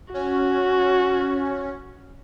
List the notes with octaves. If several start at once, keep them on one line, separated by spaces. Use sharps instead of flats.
C#4 F#4